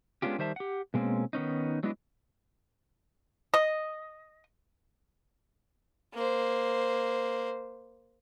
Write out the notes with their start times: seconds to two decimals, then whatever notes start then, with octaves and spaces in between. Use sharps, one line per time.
0.22 G#3 B3 C#4 D4 F4 G4
0.38 D#3 G3 C5 E5 A5
0.56 G4 F#5
0.94 B2 G#3 A#3 C4 C#4
1.33 D#3 B3 C#4 D#4
1.83 F#3 G#3 B3 D4 E4 D#5
3.54 D#5
6.14 A#3 C5